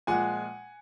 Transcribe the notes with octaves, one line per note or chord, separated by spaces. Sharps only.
A#2 F3 G#3 F#5 G#5